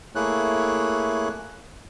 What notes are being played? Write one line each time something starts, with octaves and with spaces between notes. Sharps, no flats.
A3 A#3 E4 G#4 C#5 F#6